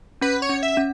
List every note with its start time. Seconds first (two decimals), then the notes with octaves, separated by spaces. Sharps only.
0.22 C#4 B4
0.42 C#5
0.49 C#4
0.63 E5
0.77 C#4